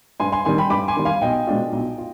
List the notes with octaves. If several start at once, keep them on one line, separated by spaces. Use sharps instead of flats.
G2 G#5 C6
G#5 C6
D#3 G3 G#5 C6
G5 B5
G2 B5 D6
G#5 C6
D#3 G3
F5 G#5
B1 D#5 G5
B2 G#3 D4 F4
B1
F4